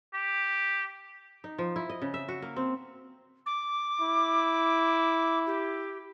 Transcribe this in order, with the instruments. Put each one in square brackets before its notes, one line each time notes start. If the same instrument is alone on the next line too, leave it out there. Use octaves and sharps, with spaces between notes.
[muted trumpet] G4
[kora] D#4
F3
E4
D#5
C#3
E5
F#4
A#3
C4
[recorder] D6
[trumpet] E4
[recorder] G4